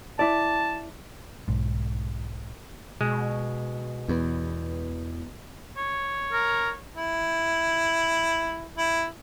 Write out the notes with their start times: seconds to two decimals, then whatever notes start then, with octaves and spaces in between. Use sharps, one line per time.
0.19 E4 D5 A5
1.48 B1 G#2
3.01 B2 G#3
4.08 E2 E3 B3 B4
5.77 C#5
6.32 A#4
6.96 E4
8.77 E4